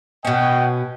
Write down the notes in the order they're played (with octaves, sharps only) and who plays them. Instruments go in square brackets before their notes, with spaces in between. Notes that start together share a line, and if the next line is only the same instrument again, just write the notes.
[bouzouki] B2 C#4 [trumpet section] D#5 F#5 G5